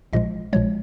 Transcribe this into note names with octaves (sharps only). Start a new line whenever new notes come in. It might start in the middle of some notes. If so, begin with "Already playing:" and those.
A#1 A#2 F3 G#3 D#5
A#1 A#2 F3 G#3 C#5